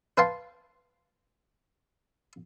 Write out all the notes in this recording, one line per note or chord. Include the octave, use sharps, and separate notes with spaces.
B4 F5 G5 A5 C6